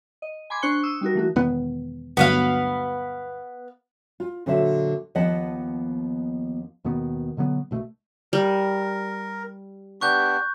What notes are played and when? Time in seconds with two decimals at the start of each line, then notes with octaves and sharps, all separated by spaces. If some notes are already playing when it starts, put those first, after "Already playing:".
0.22 D#5
0.50 G#5 B5 C6 D6 G#6
0.62 D4 C5 C#6 F#6 C#7 G7
0.83 D#6 E6
1.01 G3 D#4 F#4 A#4
1.15 E3 A3 F#4
1.36 E1 D#3 B3
2.17 D2 G2 F#3 B3 B4 F5
4.20 F4
4.46 A#2 D3 F#3 C5 E5
5.15 D#2 F3 B3 D#5 F#5 A5
6.84 D#2 B2 D#3 B3
7.37 B2 D3 F#3 B3
7.71 A#1 B2 A3
8.33 G3 A#4
10.01 B3 D4 G4 C#6 F#6 G6